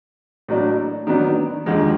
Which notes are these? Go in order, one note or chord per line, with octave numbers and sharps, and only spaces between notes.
A2 F#3 A#3 D4
D#3 F#3 B3 D4
D#2 D3 F3 G#3